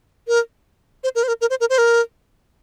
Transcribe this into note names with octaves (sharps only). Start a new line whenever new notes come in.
A#4
C5
A#4
C5
A#4
A#4
C5
A#4
C5
A#4